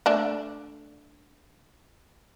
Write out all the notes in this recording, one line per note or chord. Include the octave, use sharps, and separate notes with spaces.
A3 D4 A5